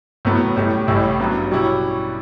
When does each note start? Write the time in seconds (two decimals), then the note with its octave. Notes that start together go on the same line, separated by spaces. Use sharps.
0.25 A2 F#3 B3
0.56 A2 G3 C#4
0.87 A1 A2 G3 C#4 E4
1.20 G2 F#3 B3
1.51 B2 G3 C#4 E4